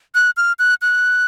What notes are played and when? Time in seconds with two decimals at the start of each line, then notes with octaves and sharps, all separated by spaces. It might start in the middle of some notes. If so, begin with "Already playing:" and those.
0.15 F#6
0.37 F6
0.59 F#6
0.82 F#6